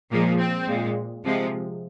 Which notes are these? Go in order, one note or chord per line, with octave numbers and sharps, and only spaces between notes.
A#2 F3 G#3 A#3
C4
A#2 G#3
C3 F3 G#3